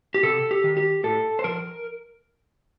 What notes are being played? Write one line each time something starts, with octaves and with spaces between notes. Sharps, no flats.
G4
C3 A4
G4
D#3
G4
A2 A4
C5
F3 A#4